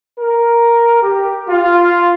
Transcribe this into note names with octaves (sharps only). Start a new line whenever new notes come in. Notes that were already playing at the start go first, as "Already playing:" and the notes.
A#4
G4
F4